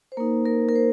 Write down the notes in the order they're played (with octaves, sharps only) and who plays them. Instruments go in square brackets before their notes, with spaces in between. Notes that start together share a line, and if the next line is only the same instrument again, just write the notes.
[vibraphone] C5
A#3 D#4 A#4
A#4
A#4
C5